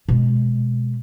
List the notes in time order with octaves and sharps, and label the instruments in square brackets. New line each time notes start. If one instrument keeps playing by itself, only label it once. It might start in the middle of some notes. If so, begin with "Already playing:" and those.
[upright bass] B2 G#3